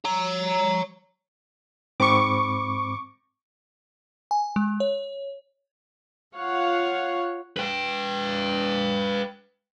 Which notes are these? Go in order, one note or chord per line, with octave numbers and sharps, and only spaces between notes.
C#5 A#5
G#2 C4 B5 C#6 D6
G#5
G#3
C#5
F4 C#5 F5 F#5
B4 G5